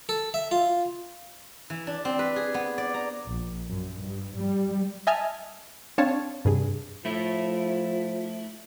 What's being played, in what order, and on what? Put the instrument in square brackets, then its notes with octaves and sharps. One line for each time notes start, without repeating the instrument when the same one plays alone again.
[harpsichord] A4
E5
F4
[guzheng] E3
D4
C4
B4
G#4
B3
D5
A#5
[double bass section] A#1
F#2
G2
G3
[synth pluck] D#5 E5 G#5 A5 F6
C4 D4 C#5 F5 A5
G2 C3 G#4
[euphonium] F3 [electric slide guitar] A3 E4